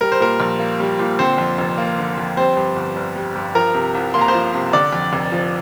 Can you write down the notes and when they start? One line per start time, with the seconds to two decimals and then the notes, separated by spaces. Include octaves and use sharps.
0.01 G3 A#4
0.12 C5
0.20 A#2 A#4
0.40 A#1
0.59 A#3
0.80 G3
0.99 A#2
1.19 D3 C4 C5
1.38 F2
1.58 F1
1.78 A#3
1.98 D3
2.18 F2
2.37 G3 C4 C5
2.57 G2
2.76 G1
2.96 G1
3.16 G3
3.36 G2
3.55 F3 A#4 A#5
3.74 C3
3.94 C2
4.14 A#3 C6
4.21 A#5
4.28 C5 C6
4.34 F3
4.54 C3
4.73 D3 D5 D6
4.93 F2
5.13 F1
5.32 F3